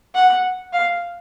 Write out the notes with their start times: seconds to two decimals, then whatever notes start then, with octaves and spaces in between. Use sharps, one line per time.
0.15 F#5
0.73 F5